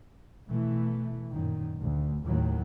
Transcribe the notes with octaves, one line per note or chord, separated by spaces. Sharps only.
B2 E3 A3
F#2 A#2 D#3
D2
D#2 A2 D#3 F#3